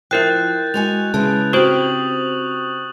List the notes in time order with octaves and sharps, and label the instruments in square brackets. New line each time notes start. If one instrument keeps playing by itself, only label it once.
[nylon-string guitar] F3 E5 [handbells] E4 A#4 G5 [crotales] F#6 G6 A6
[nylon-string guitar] G#3 F#4 G#5 [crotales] F7
[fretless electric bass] C#3 [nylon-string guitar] G#3 B3 E4 [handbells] A5
[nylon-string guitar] C4 G4 [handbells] F#4 C5 [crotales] C#6 D#6 F#7